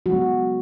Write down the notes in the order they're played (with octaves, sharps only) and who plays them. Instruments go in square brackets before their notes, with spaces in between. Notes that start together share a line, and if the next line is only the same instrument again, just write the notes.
[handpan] C#3 F#3 G#3 B3 F#4